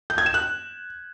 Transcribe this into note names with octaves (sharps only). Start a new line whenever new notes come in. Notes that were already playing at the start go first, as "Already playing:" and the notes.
G6
G#6
E7
F#6